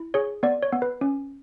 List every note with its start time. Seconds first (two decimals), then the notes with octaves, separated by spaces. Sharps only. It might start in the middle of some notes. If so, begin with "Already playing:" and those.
Already playing: E4
0.14 G#4 C#5
0.43 B3 D5
0.63 C#5
0.73 B3
0.82 B4
1.01 C#4